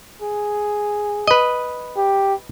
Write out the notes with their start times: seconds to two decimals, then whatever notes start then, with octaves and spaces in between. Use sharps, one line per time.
0.22 G#4
1.28 B4 D#5
1.97 G4